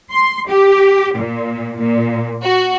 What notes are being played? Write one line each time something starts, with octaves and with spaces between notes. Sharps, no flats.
C6
G4
A#2
A#2
F#4